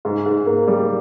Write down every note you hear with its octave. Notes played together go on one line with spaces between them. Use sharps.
G#2
G#2
A#3
G3